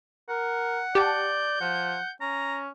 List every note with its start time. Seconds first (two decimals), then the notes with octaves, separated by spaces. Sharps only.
0.29 A#4 F#5
0.95 G4 D5 A5 G6
1.61 F3 F#5
2.21 C#4 A#5